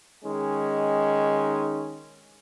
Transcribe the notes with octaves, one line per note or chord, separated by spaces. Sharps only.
D#3 G#3 C#4 D#4